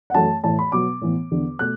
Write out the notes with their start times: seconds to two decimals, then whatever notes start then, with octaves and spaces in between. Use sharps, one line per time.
0.10 F#5
0.14 F#2 E3 A3 A5
0.44 A2 E3 A3 A5
0.59 B5
0.72 B2 F#3 B3 D6
1.02 A2 E3 B3
1.31 E2 D3 B3
1.59 B2 A3 F#6